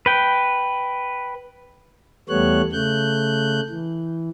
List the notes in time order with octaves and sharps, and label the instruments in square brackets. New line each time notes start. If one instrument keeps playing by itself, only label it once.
[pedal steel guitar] B4 G5
[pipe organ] E2 G3 A3 B3 C#5 F#6
C#3 A3 F#6 G6
E3